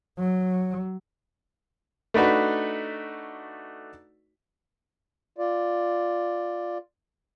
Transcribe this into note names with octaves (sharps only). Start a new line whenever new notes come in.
F#3
A3 D4 D#4 F#4 B4
F4 D5